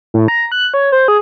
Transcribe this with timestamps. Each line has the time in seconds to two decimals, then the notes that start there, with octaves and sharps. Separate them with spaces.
0.14 A2
0.28 A#5
0.52 F#6
0.74 C#5
0.92 C5
1.08 G#4